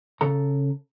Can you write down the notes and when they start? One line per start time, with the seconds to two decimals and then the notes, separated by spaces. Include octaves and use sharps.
0.21 C#3 A4 A#5